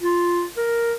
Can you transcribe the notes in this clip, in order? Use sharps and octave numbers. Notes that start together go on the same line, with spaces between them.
F4
A#4